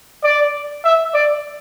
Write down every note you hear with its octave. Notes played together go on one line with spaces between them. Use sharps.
D5
E5
D5